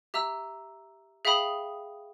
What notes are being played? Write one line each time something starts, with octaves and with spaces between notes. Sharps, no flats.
G4 E5 A#5 E6
G#4 E5 F5 G5 B5 D#6